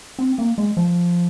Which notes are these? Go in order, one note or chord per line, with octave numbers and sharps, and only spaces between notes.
C4
A#3
G#3
F3